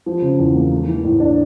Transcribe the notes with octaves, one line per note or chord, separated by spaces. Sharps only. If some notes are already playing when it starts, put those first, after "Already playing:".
F3
C#3
E2
A#3
A3
E3
A2
D4